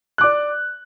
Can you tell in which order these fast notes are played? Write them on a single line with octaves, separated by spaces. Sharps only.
F#6 D6 D5